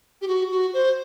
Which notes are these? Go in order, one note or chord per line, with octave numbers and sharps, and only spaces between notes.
G4
F#4
F#4
C5